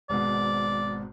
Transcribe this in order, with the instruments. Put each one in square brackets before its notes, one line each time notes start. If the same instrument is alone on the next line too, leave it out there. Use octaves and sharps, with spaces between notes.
[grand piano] G#1 G#2 B2 [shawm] D5